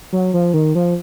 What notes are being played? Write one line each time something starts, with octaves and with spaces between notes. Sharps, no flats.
F#3
F3
D#3
F3